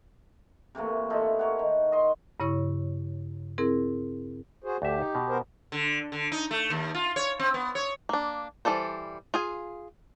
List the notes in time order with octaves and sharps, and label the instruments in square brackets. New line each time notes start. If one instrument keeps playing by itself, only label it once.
[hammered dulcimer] C3 E3 A3 A#3
E3 D#4 F4 A4
A#4 C#5 F#5
D#3
D#5 C6
[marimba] G2 C#3 E4 C#5 C#6
C4 E4 G#4 A#4
[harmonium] F#4 G#4 C5
[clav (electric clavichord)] D2 E5 [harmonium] A3 [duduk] G4
[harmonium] D#4
[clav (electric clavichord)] B2
[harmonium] B3 A#4 C5
[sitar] D3
D3
D#4
A3
D#2
F4
C#5
C4
B3
C#5
[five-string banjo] A#3 D4
E3 G3 A4 C5
F4 G#4 G#5